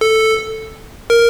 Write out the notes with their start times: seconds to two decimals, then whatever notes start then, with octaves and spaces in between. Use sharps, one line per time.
0.01 A4
1.10 A#4